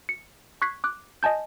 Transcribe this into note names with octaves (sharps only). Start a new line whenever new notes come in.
C#7
C#6 F#6 G#6 B6 C7
D6 F#6
D#5 G#5 A5 G6